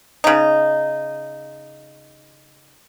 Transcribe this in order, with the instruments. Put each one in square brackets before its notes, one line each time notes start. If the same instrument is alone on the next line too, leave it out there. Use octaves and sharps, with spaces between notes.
[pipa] C#3 D#4